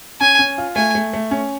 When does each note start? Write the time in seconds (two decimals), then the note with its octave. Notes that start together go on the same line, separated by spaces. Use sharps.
0.21 C#4 G#5
0.39 C#4
0.58 F4
0.76 A3 G#5
0.95 A3
1.13 A3
1.31 C#4